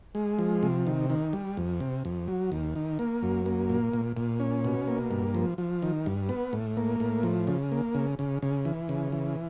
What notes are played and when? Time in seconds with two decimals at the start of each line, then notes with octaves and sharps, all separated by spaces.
0.15 G#3
0.39 F3
0.63 C3
0.87 D#3
1.10 D#3
1.33 G3
1.57 F2
1.80 C3
2.05 F2
2.28 F#3
2.52 D#2
2.75 D#3
2.99 A#3
3.23 F#2
3.46 A#3
3.70 A#2
3.93 A#2
4.17 A#2
4.40 C#4
4.65 B2
4.87 A#3
5.11 G2
5.34 F3
5.58 F3
5.82 D#3
6.06 G2
6.29 B3
6.53 A2
6.77 A#3
7.00 A2
7.23 F3
7.47 C#3
7.72 A#3
7.95 C#3
8.19 C#3
8.42 C#3
8.65 E3
8.89 C#3
9.12 E3